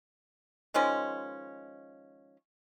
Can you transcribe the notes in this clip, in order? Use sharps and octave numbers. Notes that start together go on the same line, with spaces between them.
D#3 F3 G#3 C#4